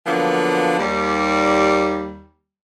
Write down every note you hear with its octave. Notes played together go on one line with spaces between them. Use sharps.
D3 F3 F#3 A#3 B3
D#2 G3